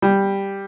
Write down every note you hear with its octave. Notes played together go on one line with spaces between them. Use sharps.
G3